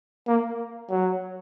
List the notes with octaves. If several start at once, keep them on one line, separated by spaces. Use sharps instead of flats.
A#3
F#3